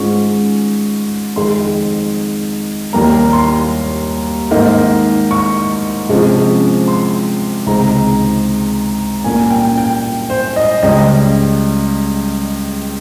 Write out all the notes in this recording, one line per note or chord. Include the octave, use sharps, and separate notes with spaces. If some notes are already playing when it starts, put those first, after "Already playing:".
Already playing: G#2 D#3 G#3 C#4 F4 C#6
F2 D#3 G#3 D#4 C6
D#2 D#3 G3 A#3 A#5
C6
G#2 D#3 A#3 D#4
C#6
C3 F3 G#3 C#4
C6
C#2 C3 D#3 G#3 C4 A#5
A#2 G3 A#3 C#4 G#5
G5
G5
C5
D#5
C#2 C#3 G3 D#5